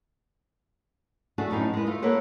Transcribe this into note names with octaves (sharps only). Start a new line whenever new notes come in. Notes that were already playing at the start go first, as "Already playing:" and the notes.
A3 D4 F#4 G#4 A4
F#2 A2 B3 D#4
G#3 B4
A3 F4
A#3 A4 B4 C#5 F#5